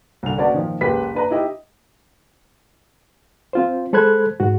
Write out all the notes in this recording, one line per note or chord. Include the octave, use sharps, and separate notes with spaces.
C2 D3 F7
C#4 F#4 B4 D5 A5
A#2 D#3 F3
F#1 C#2 G4 B4 B6
D4 B4 A#5
D#4 E4 G4 D#5
C4 F4 C5
G#3 A4 C5 B5 F#6 G#6
G#2 F#4